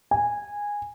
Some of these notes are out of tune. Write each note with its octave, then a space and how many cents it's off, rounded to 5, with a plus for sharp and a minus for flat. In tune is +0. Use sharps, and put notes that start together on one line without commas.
G#5 -15